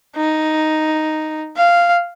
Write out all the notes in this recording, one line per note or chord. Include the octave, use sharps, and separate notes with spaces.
D#4
F5